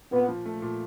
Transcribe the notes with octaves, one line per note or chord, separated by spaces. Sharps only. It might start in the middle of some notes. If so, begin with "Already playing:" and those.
A#2 B3
F3
A3
A#2